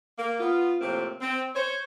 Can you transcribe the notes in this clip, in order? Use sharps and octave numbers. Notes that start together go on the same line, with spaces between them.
A#3
B3 F4
A2 C3 F3 A#3 C4
C4
C5 C#5